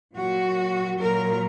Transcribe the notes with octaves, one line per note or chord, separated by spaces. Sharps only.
A#2 F#3 F#4
A#2 F#3 A#4